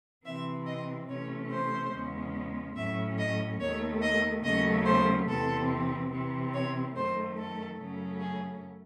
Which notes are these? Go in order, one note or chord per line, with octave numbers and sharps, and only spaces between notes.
C3 E3 C4 E5
D#5
C3 E3 A3 C#4 C#5
C5
E2 C#3 G#3 C#4
A2 F#3 C#4 E5
D#5
D#2 D#3 A3 C#5
D#5
D#2 C#3 F#3 A3 C#4 D#5
C5
E2 C3 E3 C4 A4
C3 E3 C4
C#5
F#2 D#3 A3 C5
A4
F#2 C#3 F#3 A3 C#4
G#4